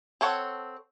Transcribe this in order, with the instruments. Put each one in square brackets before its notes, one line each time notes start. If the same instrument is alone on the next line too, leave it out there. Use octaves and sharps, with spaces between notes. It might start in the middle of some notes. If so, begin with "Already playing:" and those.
[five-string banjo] C4 A4 C#5 F#5